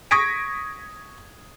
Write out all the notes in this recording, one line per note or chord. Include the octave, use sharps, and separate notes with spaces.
C#6 D#6 G#6 A#6 B6 D7